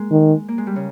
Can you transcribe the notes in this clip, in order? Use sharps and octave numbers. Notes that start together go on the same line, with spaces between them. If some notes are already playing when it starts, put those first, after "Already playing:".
Already playing: G#3 A#3
D#3
A#3
G#3
G3
C#3